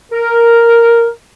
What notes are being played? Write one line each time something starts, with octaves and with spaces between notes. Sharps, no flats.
A#4